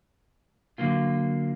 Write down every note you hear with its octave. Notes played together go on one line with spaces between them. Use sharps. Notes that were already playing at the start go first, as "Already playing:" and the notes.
D3 F#3 A#3 F4